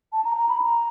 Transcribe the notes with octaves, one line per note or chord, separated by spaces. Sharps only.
A5
A#5
A#5
B5
A#5